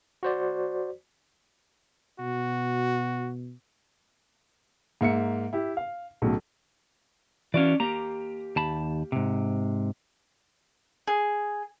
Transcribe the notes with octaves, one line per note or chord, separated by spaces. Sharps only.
F#4 C5 D5
B2 F#4
G#2 A#3 E5 C#7
E4 G4
F5
B1 A2 C#3 F#3
E3 C#4 F#4 D5 F5
A#3 G4 A#5
D#2 A5 B5
G#2 C3
G#4